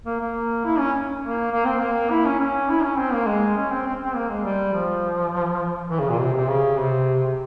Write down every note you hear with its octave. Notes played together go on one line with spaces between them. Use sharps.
A#3
A#3
E4
C#4
A#3
A#3
C4
A#3
E4
C#4
C#4
E4
C#4
C4
A#3
G#3
C#4
C4
C4
C4
A#3
G#3
G3
F3
E3
C#3
A#2
C3
C3
C#3
C3